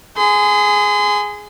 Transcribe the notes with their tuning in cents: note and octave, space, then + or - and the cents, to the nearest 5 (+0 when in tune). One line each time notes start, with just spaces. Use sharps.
G#4 +0 C6 -40